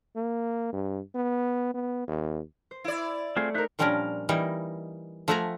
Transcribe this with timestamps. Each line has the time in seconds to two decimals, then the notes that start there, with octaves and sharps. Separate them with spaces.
0.16 A#3
0.73 G2
1.15 B3
1.74 B3
2.08 D#2
2.71 C5
2.84 E4 D5
3.37 A3 C4 F4 G#4
3.54 D#4 A#4 C5 E5 F#6
3.79 A#2 F3 G3 C#4 D4 A#4
4.29 E3 G3 A#3 D#4
5.28 F3 A3 E5 F#5 G#5 A#5